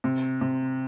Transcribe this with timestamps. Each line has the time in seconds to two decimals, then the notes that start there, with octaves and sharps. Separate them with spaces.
0.04 C3
0.41 C3